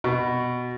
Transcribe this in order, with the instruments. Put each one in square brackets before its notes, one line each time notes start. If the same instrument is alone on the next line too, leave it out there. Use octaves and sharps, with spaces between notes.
[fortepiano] B2